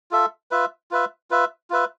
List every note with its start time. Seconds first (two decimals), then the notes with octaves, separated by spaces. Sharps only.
0.11 F4 A4 E5
0.51 F4 B4 E5
0.91 F4 B4 E5
1.31 F4 B4 E5
1.70 F4 B4 E5